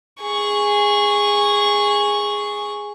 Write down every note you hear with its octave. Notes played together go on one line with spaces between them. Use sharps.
G#4 C#6